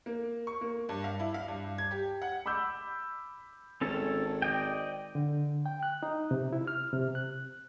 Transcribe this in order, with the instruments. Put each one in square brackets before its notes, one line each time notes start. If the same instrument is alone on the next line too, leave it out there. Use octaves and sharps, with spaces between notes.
[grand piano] A#3
C#6
A#3
G2
F5
E4
F5
G2
G#6
G4
F#5
B5 D6 E6 G6
[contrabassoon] G#1 [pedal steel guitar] C#4 A4 A5
[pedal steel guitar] D5 D#5 G5
[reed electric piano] D3
G5
F#6
D#4
C3
E4
F6
C3
F#6